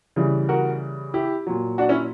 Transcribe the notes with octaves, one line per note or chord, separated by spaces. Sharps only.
C#3 E3 G3
F#4 A#4
E4 G4
A#2 F#3
D4 F#4
C#4 E4